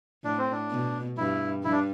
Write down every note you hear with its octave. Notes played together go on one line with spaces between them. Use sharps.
A2 D4
C4
D4
B2
G2 E4
G2 E4
D4